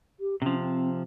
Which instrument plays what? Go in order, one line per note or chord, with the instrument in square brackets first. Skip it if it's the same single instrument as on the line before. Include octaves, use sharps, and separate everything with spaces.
[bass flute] G4
[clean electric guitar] C3 F3 [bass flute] C#4
[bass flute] C4